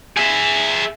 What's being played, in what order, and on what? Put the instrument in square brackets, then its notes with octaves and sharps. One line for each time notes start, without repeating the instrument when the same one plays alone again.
[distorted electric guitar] G#4 E5